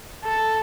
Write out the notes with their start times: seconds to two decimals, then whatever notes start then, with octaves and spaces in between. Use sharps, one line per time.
0.24 A4